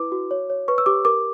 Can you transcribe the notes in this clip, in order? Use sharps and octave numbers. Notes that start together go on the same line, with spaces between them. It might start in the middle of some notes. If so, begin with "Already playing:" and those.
Already playing: E4 B4 D6
F#4
C#5
C#5
B4 C#6
E6
G4 D6
A#4 D6